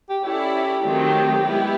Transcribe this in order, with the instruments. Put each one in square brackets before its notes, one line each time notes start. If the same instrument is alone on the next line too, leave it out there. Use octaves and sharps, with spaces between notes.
[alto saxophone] G4
[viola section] C#4 E4 A4 D5 [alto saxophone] G4
[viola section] D#3 F#3 A3 C4
G#3 B3 E4